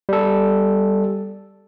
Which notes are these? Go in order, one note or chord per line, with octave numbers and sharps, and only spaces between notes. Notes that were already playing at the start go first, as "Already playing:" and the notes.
G3 A4